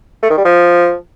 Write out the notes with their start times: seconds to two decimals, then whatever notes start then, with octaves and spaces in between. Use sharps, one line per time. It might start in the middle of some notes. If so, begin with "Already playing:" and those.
0.22 A3
0.30 D#3
0.37 G3
0.45 F3